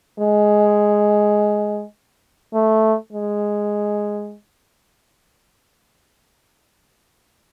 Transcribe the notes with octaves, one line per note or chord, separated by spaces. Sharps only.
G#3
A3
G#3